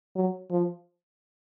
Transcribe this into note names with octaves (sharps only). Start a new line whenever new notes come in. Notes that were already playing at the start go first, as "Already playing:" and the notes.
F#3
F3